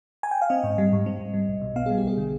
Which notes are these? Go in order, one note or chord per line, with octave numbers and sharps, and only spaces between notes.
G#5
G5
F5
C4 D#5
G#2
G3
G#2
C4
G#2
G3
B1
B2
B3 F5
G3 G#4
G4
B1 G#4
D3